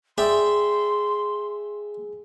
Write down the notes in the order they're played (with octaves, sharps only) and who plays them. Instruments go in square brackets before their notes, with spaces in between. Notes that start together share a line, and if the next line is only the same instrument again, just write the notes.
[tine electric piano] G#4 [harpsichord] D5 E5 G5 [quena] C6